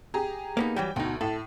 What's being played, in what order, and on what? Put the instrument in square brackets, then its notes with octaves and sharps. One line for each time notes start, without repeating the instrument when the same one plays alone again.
[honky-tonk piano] G4 G#4 A#5
[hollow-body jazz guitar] A#3 B3 D#4
[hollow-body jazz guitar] E3 F#3 G3 [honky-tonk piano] G5
[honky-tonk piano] D2 [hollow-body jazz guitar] B2 D#4
[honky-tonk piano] A2 [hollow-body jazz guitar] A4